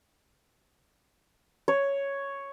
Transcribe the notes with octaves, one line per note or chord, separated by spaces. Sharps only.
C#5